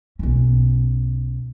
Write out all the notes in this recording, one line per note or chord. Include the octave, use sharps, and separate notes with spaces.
B1 C#4